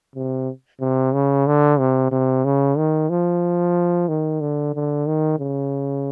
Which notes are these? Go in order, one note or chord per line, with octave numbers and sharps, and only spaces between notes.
C3
C3
C#3
D3
C3
C3
C#3
D#3
F3
D#3
D3
D3
D#3
C#3